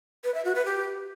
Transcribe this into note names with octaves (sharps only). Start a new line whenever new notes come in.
B4
E5
F#4
B4
G4